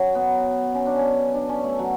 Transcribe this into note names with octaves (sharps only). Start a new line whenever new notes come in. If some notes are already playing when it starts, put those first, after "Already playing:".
Already playing: F#3 C#4
B3
C#4
D4
C#4
D4
C#4
A3
F#3